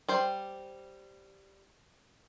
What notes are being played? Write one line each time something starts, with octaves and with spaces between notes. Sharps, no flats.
G3 C5